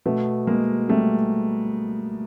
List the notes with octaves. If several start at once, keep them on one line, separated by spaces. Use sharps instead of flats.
B2 A3 B3
G#3 A#3
G3 A3